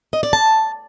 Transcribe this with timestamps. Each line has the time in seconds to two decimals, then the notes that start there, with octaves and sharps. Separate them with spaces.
0.13 D#5
0.23 D5
0.33 A5